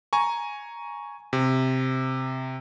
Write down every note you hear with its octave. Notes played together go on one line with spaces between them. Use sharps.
G#5 A#5 C#6
C3